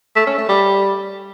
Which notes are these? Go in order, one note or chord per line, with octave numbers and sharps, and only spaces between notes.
A3
C#4
A3
G3